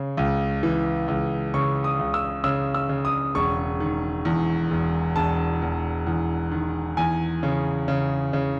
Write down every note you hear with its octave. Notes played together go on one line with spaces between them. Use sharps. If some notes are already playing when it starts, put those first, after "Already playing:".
Already playing: C#3
C#2
E3
C#2
C#3 C#6
D#6
C#2
E6
C#3 E6
E6
C#3
D#6
E1 C#6
D#3
E2
E1
E1 A5
E2
E2
D#3
E2 G#5
C#3
C#3
C#3